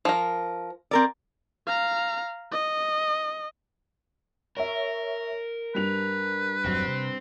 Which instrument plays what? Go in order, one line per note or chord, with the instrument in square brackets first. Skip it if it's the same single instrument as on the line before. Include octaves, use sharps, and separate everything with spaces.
[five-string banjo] F3 A#4
[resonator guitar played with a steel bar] C4 A#4 D5
[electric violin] F5 A#5
D#5
[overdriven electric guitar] A#4 [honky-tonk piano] C#5 E5
[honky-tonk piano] G2 G3 F7 [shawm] B4
[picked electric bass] D#1 F#2 F#3 [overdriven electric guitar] C4
[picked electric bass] C3